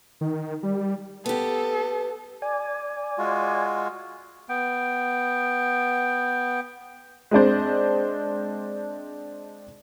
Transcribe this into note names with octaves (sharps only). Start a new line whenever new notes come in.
D#3
G3
B3 G4 A4
D5 G#5
G#3 F4 F#4
B3 G5
G#3 C4 D4 C5